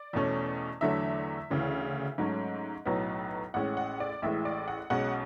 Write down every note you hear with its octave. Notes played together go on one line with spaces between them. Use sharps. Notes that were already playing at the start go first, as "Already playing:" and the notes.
Already playing: D5
E2 B2 A3 C#4
E2 D3 F#3 A3 E5
D2 C#3 E3
G#2 F#3 A3 C#4
B1 A2 F#3 B3
A1 A2 G#3 C#4 F#5
F#5
D5
A1 A2 E3 G#3 E5
D5
F#5
B1 B2 G#3 C#4 F#5